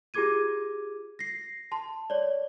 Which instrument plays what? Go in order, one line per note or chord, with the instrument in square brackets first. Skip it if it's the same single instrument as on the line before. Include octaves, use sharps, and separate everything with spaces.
[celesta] F4 G4 G#4 D6 G#6 D#7
A#6 C7
A5 C6
C#5 D5